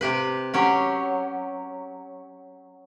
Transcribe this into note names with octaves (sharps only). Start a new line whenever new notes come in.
C3 G4 B4
F#3 C#4 G4